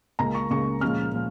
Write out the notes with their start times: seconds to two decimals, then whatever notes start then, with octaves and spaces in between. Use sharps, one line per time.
0.19 C#2 C#3 A#3 A#5
0.35 C#6
0.50 C#2 C#3 A#3 C#6
0.81 A#2 F3 G#3 C#4 F6
1.13 A#2 F3